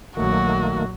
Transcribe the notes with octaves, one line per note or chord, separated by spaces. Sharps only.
A#1 D#3 F#3 A3 A#3 F#4